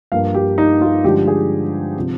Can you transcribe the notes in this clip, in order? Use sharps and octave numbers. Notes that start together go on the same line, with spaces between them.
G2 F3 A#3 F5
G4
D#4
F4
G2 D3 F3 G#3 G4
G#4
C3 F3